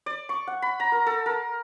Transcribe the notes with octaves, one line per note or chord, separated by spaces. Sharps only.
D5
C#6
F#5
B5
A#5
A#4
A4
A#4